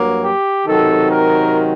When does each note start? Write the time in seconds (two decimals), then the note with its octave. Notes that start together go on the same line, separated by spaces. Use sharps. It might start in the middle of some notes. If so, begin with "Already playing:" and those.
Already playing: G2 F#3 A#3
0.22 G4
0.66 C3 D#3 F#3 C4 A4
1.10 A#4